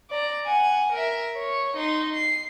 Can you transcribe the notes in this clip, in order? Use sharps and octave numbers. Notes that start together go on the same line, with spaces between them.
D5 A#5
F#5 G#5
A#4 E5
C#5
D#4 C6
C7